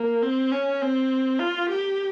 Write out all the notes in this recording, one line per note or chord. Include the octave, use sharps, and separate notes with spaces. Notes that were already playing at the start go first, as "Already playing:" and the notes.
Already playing: A#3
C4
C#4
C4
F4
G4